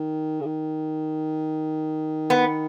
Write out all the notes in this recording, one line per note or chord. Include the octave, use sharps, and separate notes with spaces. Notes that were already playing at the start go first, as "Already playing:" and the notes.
Already playing: D#3
C#3
D#3
B3